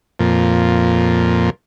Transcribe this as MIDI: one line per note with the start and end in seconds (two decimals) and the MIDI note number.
0.20 1.50 41
0.20 1.50 46